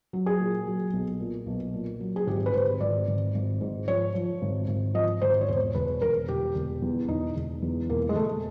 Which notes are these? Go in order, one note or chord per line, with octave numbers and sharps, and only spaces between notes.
F#3
G#4
A#2
F#3
B1
A#2
B1
A#2
F#3
G#4
G#1 G4
B4
G#1 C5
G#1 D5
G#1
G#1
G#2
F3 C#5
F3
G#1
G#1
F3 D#5
G#1 C5
C#5
E1 C5
E1 B4
E1 A#4
E1 G4
E1
E2
E1 D#4
E1
E2
E1 A#3
G#3
E1 A3